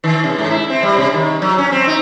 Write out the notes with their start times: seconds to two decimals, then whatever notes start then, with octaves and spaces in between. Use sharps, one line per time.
0.04 D#3
0.24 C3
0.38 G#2
0.50 E4
0.70 C4
0.83 G3
0.97 C3
1.13 D#3
1.42 F#3
1.58 C#4
1.72 C4
1.87 D#4